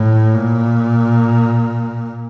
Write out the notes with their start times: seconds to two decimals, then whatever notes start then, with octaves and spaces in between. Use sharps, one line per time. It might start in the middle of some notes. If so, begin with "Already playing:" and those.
Already playing: A2
0.35 A#2